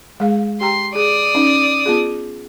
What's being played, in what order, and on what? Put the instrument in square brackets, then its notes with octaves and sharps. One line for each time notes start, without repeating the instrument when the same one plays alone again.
[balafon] G#3 G#4 F5
[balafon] G4 G5 A#5 [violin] C6
[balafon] G#4 [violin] D5 D#6
[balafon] C#4 D#4
B3 F4 G#4